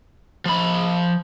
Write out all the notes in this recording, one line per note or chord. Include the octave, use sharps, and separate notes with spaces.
F3 B5